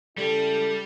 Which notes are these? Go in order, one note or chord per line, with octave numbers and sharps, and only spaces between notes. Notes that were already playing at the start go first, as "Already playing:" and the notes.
C#3 G3 E4 A4